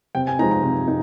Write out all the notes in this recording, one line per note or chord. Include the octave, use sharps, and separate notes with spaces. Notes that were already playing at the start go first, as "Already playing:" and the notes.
C3 G5
G#5
F3 G#3 D#4 A#5
A#5
C3
D#4